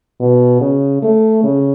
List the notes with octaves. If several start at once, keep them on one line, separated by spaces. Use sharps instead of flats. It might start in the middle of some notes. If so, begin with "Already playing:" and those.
B2
C#3
A3
C#3